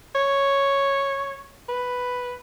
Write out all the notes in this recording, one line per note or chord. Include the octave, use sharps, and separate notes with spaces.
C#5
B4